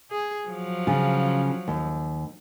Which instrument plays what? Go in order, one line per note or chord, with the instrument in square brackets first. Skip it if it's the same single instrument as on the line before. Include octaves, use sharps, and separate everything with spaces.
[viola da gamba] G#4
F3 F#3
[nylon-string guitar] C#3 F4
D#2